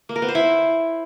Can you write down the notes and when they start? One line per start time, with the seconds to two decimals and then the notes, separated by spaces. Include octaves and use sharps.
0.09 A#3
0.16 A#4
0.22 B3
0.28 C5
0.35 E4